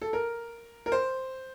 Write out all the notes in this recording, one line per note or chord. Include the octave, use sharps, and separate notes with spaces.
A4
A#4
A#4
C5